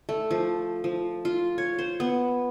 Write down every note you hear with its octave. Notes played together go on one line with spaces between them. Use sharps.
A3
F3
F3
F4
C#5
C5
B3